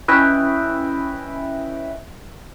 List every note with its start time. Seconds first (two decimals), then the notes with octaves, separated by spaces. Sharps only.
0.08 C#4 E4 B4 D#5 E5 G5